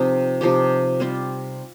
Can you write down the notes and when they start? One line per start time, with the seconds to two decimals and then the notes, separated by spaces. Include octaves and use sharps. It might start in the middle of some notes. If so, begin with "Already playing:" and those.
Already playing: C3 F3 C4 D#4
0.41 C3 F3 D#4 G4
1.00 G3 C4 F4